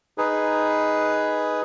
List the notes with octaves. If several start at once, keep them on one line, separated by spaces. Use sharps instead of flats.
D#4 G#4 B4